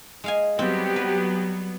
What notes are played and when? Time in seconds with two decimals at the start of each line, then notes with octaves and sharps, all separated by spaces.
0.24 G#3 F5 G#5
0.59 F#3 G3 B3 C4 G4
0.96 B4